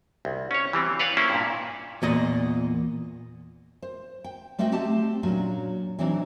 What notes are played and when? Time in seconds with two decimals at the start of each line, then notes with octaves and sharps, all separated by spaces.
0.25 C2
0.51 C#4 C#5
0.73 E3 G3 C4
1.00 B4 C#5 D5 F5 F#5
1.17 A#3 C#4 E4 C5
1.30 G2 A#2
2.02 E2 A#2 D#5
3.82 C5
4.24 G5
4.59 G3 A3 C4 F#4 D#5 G5
4.72 A3 C4 G4 F#5 A5
5.23 A#2 F#3 C#4 D4
5.99 E3 F#3 G#3 C4 D4 D#4